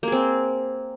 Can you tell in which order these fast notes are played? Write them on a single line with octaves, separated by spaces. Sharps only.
A#3 G#4 C4